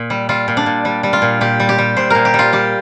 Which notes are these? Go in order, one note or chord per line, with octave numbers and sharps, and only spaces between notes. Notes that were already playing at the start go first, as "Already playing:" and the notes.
Already playing: A#2
G3
G3 F4
A#2
D4
A#2
G3
G3
F4
A#2
A#2 G4
G3
G4
G3
A#2 C5
A#2 A#4
G4
G3
F4
G3 G4